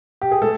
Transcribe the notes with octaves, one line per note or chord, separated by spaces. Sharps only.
G4
G#4
A3 A4